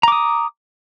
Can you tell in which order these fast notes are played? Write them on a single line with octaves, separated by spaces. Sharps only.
A#5 D6 D#6